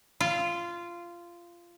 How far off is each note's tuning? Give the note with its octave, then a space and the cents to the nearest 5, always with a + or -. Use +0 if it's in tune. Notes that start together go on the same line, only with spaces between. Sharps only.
F4 -15